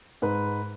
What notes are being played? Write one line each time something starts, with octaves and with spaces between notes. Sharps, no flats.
G#2 B4